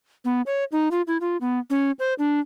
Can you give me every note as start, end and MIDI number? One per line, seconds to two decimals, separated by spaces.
0.25 0.42 59
0.46 0.64 73
0.72 0.89 63
0.91 1.02 65
1.07 1.17 64
1.21 1.37 65
1.41 1.59 59
1.70 1.91 61
1.99 2.14 72
2.19 2.40 62